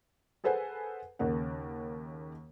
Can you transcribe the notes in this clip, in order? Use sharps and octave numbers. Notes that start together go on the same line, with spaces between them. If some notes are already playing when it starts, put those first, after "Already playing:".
G#4 A4 B4 C5 F#5 G#5
D#2 C#3 A#3 A#4 F#5